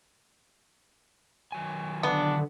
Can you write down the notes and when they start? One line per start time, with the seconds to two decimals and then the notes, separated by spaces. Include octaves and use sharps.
1.52 D#3 F#3 G#5
2.03 D3 B3 D4